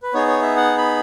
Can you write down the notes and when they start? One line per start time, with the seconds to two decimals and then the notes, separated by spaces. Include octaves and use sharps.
0.02 B4
0.14 B3 D#4 G#4 C#5
0.27 C#5
0.42 E5
0.56 F#5
0.78 B5